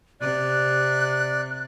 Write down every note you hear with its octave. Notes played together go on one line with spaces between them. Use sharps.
C3 D5 F#6